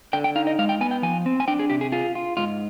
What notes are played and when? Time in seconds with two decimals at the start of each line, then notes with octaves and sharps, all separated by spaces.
0.13 D3 G5
0.24 G5
0.36 D#4 F5
0.47 D#5
0.59 G#3 F5
0.69 G5
0.81 B3 G#5
0.91 G5
1.03 F3 G#5
1.26 C4
1.40 G#5
1.48 D4 G5
1.59 G#4
1.70 C3 G4
1.81 G#4
1.92 F4 G#4
2.15 F4
2.37 G#2 F4